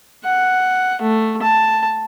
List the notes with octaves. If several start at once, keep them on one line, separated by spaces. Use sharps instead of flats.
F#5
A3
A5